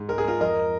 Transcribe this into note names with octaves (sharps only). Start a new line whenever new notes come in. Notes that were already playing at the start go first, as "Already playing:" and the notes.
Already playing: G#2
G#3 A#4
G#4
G#3 F4 A#4
F2 A#4 D#5